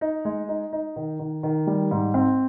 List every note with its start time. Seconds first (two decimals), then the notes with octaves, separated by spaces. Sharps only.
0.01 D#4
0.25 G#3
0.49 D#4
0.73 D#4
0.96 D#3
1.19 D#3
1.43 D#3
1.67 G3
1.91 G#2
2.14 C4